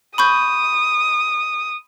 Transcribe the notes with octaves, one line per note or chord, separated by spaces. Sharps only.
B5 C#6 D#6 G6